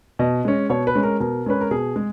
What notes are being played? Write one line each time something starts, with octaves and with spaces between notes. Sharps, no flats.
B2 D#5
G#3 C#4
B2 C#5
B4
G#3 C#4
A#4
B2 A#4
G#3 C#4 B4
A#4
B2 G#4
G#3